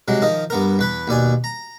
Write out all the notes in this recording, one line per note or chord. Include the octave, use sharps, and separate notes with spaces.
C3 F#3 G#3
D#3 F3 D#5
G2 B3 A#4
E2 B4 B5
D#2 B2 D5 G#5
A#5